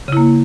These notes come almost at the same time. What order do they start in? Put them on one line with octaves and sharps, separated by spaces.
C#3 E4 A#3